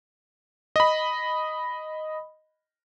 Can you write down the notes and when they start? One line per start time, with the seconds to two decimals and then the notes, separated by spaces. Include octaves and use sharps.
0.76 D#5 B5